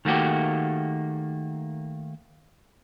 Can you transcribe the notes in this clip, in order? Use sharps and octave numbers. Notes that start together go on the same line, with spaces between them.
D#3 A3 A#3 F#4 G4